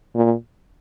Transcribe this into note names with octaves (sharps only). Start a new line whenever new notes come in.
A#2